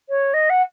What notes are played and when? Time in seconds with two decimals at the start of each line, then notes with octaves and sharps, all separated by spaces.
0.09 C#5
0.33 D#5
0.49 F#5